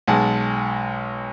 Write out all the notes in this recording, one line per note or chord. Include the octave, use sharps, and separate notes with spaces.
B1 G#3 F#5 G#5 A5